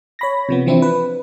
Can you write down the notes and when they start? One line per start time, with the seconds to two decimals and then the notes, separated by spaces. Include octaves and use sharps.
0.19 C#5 B5 A#6
0.49 C3 F3 B3
0.66 E3 F3 C4 D4 E4
0.82 B4